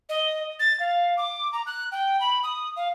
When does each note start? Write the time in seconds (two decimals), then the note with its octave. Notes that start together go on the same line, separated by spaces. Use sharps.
0.09 D#5
0.59 A6
0.80 F5
1.17 D6
1.53 A#5
1.66 F#6
1.92 G5
2.21 B5
2.43 D#6
2.76 F5